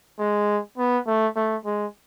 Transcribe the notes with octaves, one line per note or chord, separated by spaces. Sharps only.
G#3
B3
A3
A3
G#3